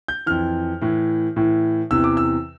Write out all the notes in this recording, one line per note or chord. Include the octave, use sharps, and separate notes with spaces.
G6
F2 E3 F6
A2 E3
A2 E3
E2 C3 E3 E6
D6
E6